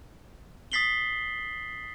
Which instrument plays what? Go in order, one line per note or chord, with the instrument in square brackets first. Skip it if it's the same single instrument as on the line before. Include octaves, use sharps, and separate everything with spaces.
[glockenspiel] D#6 A6 B6 C7 F#7 G7